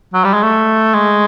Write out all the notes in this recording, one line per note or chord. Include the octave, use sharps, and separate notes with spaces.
F#3
G3
G#3
A3
G#3